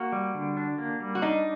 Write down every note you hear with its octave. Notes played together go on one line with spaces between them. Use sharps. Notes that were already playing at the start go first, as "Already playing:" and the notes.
Already playing: A#3 F#4
G3
D3
D4
A#3
G3
F#4
D4 D#4